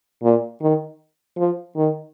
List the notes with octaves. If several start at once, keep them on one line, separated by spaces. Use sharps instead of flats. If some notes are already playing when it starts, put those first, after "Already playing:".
A#2
D#3
F3
D#3